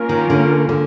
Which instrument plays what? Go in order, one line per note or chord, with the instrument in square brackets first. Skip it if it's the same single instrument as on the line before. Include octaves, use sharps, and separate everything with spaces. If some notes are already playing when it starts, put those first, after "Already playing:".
Already playing: [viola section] A#3 C#4 F4 A#4
[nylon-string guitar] D#3
D3
D3